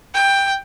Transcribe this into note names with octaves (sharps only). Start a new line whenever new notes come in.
G5